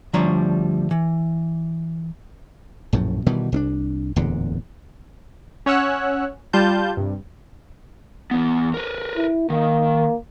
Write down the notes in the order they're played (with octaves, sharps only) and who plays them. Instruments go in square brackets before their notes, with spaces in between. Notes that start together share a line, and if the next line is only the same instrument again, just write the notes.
[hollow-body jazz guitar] D2 F3 G3 D4 C#5 A#5
E3
[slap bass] A#1 F#2 A2
B2 D#3 E3 G3
C2 C#4 D4
D1 E2 A#2 D3
[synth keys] C#4 C#5 F#5 E6 F#6
G3 F4 A5 G6
G2 C3
[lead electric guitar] E2 B3
A#4 B4
[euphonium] E4
[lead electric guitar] D#3 [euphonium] A#3